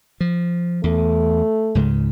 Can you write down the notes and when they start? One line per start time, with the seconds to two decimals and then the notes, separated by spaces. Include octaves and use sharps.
0.21 F3
0.84 E2 A3
1.75 C#2 G#2 C#3